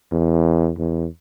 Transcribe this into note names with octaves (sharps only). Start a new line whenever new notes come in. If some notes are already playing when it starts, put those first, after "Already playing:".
E2
E2